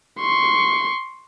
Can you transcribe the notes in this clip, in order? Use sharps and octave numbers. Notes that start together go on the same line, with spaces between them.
C6 C#6